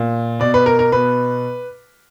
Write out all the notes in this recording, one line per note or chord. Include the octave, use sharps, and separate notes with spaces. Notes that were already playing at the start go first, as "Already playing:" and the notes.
Already playing: A#2
B2 D5
B4
A#4
A#4
B2 B4